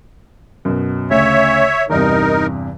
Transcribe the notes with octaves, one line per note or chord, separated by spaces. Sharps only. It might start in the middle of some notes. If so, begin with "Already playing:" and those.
F#2 B2
D2 C#3 C#5 E5
E2 G2 C3 D#4 A#4